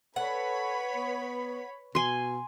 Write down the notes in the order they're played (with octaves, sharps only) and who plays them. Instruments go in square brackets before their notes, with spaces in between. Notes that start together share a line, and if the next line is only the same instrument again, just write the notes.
[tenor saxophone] A4 [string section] B4 C#5 B5 [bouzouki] F#5
[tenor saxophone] B3
[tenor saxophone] B2 [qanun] G#5 C6